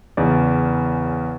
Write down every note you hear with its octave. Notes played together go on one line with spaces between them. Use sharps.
E2 C#3 D5